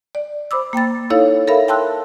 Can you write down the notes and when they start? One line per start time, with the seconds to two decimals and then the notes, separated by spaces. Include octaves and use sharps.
0.15 D5
0.51 C5 B5 D6 E6
0.73 A#3 G5 B5 A6
1.10 D#4 E4 A4 C#5 F5
1.47 A4 A#4 C#5 E5 F5 B5
1.68 G5 A5 C6 E6 F#6